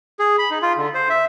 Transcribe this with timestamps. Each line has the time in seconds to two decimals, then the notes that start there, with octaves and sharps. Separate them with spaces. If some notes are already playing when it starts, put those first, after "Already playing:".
0.20 G#4
0.38 B5
0.50 D#4
0.62 F4
0.77 D3
0.94 C5
1.09 E5